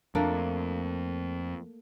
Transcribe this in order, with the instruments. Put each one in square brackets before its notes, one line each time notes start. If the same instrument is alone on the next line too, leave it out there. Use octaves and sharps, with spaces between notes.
[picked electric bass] F2 [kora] A3 A#3 D4